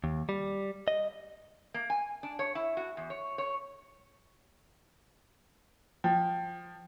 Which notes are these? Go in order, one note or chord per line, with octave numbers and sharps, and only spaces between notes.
D#2
G3
D#5
A#3
G#5
D4
C#5
E4
F#4
E2
C#5
C#5
F3 G5